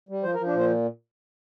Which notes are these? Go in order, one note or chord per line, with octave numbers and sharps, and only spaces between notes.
G3
F3 C5
A#4
F3
D4
A#2 C5